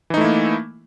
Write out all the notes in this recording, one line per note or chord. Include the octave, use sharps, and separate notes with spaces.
E3 A3 A#3 D#4 E4